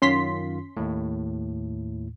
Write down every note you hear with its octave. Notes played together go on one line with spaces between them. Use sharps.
F#2 D#3 C#4 F4 C6 B6
D#2 A2